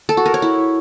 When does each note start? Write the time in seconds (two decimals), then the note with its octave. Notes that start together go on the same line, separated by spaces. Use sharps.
0.09 A4
0.17 F#4
0.26 A#4
0.34 C#5
0.42 E4